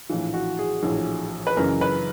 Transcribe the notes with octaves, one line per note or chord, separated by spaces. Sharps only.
A#1 A2 E3 F4
F#4
G#4
A#1 A2 E3
B4
F#1 F#2 C#3 E3 A#4
B4